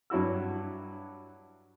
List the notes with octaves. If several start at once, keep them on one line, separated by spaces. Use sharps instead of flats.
G2 F#3 E4 F#4 E6